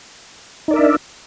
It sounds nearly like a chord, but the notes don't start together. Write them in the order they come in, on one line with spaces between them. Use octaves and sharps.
D#4 D5 A#4 E5 D4